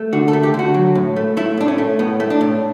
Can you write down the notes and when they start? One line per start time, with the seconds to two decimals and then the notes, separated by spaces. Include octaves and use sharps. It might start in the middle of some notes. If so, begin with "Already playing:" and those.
Already playing: A3
0.13 D3 F#4
0.28 A4
0.33 A3
0.43 G4
0.54 D3
0.59 F#4
0.74 F#3
0.95 A2
1.16 A3
1.37 A3 E4
1.58 A2 D4
1.68 C#4
1.78 A3
1.99 A2 B3
2.20 A3
2.30 D4
2.41 A2